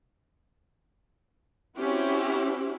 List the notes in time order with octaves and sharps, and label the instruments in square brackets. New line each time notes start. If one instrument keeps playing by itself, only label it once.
[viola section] C4 C#4 E4 F#4 G4